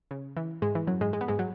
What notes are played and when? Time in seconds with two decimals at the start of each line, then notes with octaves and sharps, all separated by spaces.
0.11 C#3
0.37 E3
0.62 G#2 G#3
0.75 E3
0.87 F#2 F#3
1.01 G#2 G#3
1.13 G#3
1.21 B3
1.28 G#2 G#3
1.39 F#3